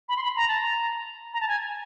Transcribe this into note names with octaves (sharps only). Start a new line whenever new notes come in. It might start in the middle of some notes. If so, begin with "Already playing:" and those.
B5
C6
B5
A#5
A5
A#5
A#5
A5
G#5